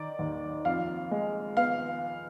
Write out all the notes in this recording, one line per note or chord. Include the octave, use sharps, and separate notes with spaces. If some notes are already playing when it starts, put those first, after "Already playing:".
Already playing: D#3 D5
D#2
F2 F5
G#3
B3 F5